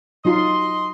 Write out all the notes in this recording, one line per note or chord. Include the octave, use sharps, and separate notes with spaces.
F#3 D#4 F4 D#5 C6